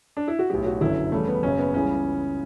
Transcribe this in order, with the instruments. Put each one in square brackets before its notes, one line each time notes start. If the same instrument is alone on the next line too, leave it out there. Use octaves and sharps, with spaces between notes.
[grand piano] D4
E4
F#4
B1 A2 F#3 G4
F#4
G1 F#2 D3 F#3 E4
E2 C#3 G3 A3
B3
F#1 F#2 C#3 C#4
B3
C#2 C#3 E3 G3 C#4